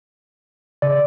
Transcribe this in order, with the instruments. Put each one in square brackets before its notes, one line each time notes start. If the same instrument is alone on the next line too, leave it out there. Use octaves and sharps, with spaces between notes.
[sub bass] C#3 [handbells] D5